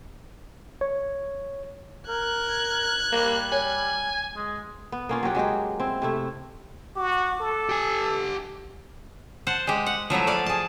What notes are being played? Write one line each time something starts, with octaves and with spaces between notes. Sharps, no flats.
C#5
A#4 F#6 G#6
G3 A#3
C#5 G#5
G#3
B3
A#3 C#4 F4
F#3 C#4 G4 F#5
F#3 G#3 F#4 G4
C4 E4
C3 A3 E4
F#4 D6
A4
G4 G#5
C5 F#5 A5
G#3 G4
F#5
F3 F#3 A3 E4
D5 F5 A5
G#4 A5